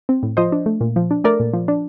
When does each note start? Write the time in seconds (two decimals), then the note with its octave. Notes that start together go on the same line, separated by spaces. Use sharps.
0.09 C4
0.23 A2
0.37 F3 C5 D#5
0.52 D4
0.66 A3
0.81 A#2
0.96 F3
1.11 D4
1.24 A3 A#4 D5
1.40 A#2
1.53 F3
1.68 D4